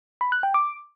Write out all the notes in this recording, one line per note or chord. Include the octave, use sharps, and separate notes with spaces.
B5
F#6
G5
D6